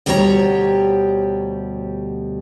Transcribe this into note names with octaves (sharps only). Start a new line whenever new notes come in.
D2 B2 G3 G4 C#5 A#5